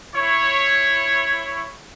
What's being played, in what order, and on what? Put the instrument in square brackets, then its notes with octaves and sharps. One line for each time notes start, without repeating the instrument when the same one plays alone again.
[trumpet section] E4 C#5